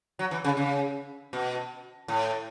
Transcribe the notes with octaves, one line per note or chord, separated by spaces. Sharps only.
F#3
E3
C#3
C#3
B2
A2